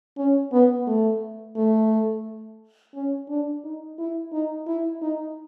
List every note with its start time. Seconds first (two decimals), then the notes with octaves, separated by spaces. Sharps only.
0.18 C#4
0.53 B3
0.87 A3
1.56 A3
2.95 C#4
3.29 D4
3.64 D#4
3.98 E4
4.32 D#4
4.67 E4
5.02 D#4